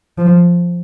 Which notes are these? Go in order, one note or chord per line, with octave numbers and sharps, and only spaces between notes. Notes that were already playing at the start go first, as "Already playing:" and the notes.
F3